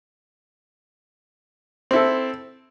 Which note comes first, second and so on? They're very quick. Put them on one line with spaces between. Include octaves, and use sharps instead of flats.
C4 E4 A4